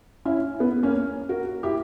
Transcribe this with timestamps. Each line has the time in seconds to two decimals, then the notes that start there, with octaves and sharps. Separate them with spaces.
0.25 C#4 E4
0.60 B3
0.83 A#3 C#4
1.29 F#4 A#4
1.63 E4 G4